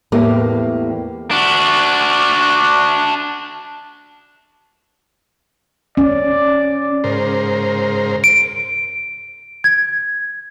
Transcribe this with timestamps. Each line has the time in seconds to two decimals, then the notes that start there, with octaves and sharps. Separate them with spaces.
0.12 E2 A2 A#3 G4
1.31 D4 F#4
5.97 C#4 D5
7.04 G#2 C#3 A#4 C5
8.24 D7
9.64 G#6